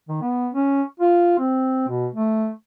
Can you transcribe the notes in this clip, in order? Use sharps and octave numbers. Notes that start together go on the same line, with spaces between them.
D#3
B3
C#4
F4
C4
B2
A3